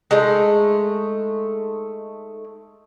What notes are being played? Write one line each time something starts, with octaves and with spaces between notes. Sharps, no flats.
G#3 A3 D#4